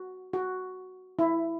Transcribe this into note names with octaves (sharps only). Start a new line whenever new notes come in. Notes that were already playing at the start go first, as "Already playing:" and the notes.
Already playing: F#4
F#4
E4